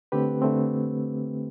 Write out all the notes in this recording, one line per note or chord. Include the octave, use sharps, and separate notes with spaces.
D3 A3 C4 G4 B4
D3 A3 C4